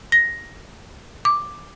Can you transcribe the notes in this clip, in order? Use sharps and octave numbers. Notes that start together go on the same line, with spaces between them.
A#6
D6